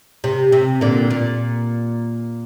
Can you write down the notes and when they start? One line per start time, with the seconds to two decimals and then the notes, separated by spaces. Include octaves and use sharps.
0.24 C3
0.52 C3
0.81 A#2 D3
1.10 A#2